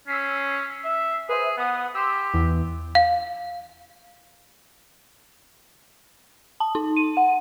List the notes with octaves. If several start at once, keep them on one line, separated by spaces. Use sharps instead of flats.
C#4 E6 B6 C7
E5
G#4 B4 C5 E5
B3 F#5 D#6
G4 C6 E6
E2
F5
A5
D#4
D#7
F#5